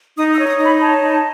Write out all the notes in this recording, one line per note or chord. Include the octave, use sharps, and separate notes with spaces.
D#4 D#6
E6
C#5
D#6
D#4 B5
C#5 A5
D#4